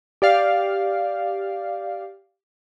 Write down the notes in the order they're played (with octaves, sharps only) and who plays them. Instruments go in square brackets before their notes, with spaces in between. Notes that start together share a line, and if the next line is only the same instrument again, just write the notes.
[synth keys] G4 D5 F5